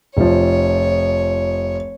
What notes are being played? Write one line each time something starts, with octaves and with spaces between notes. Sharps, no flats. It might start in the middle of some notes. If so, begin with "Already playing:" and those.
F1 F3 C#5